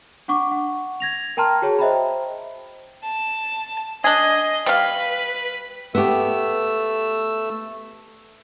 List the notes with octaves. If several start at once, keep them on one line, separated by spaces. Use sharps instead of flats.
D4 F#5 C#6 D6
F#5
G#6 A#6 F7
A#4 G5 A5 A#5 C6 F6
F#4 G#4 C#5 A5
C5 D#5 E5 G5 A#5 B5
A5
D4 G#4 D#5
G3 B4 F5
A3 B3 G4 E6